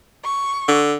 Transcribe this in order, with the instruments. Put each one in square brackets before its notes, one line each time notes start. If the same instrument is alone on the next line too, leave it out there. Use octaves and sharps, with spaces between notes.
[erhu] C#6
[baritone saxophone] D3